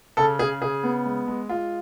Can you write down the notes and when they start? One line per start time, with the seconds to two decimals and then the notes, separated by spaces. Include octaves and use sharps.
0.17 C#3 A4
0.39 C#3 G#4
0.61 C#3 G#4
0.83 B3
1.05 G#3
1.27 G#3
1.49 G#3 F4